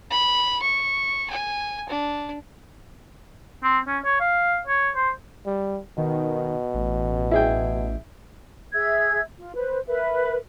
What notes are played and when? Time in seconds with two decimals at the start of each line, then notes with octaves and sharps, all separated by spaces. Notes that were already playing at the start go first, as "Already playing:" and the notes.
0.11 B5
0.62 C#6
1.30 G#5
1.89 D4
3.63 C4
3.87 C#4
4.05 C#5
4.20 F5
4.67 C#5
4.96 C5
5.46 G3
5.98 B2 D#3
6.74 A1
7.31 E4 G#4 G5
8.74 G#4 E5 E6 G#6
9.38 F4
9.55 B4 C5
9.88 A#4 B4 E5